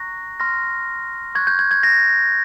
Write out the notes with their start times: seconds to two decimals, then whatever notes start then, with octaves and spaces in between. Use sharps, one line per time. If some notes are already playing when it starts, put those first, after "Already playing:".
Already playing: A#5 C#6 F#6 A#6
0.40 C6 F6 A#6
1.35 C#6 F#6 G#6
1.47 G6
1.59 G#6
1.71 G#6
1.83 A#6